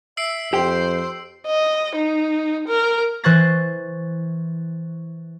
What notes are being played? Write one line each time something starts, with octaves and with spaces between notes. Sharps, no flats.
E5 E6 C7 D7
F2 G4 C5 G5
D#5
D#4
A#4
E3 C5 C#6 F#6 A6 A#6